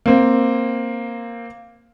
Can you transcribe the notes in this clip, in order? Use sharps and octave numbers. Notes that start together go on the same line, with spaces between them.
A#3 C4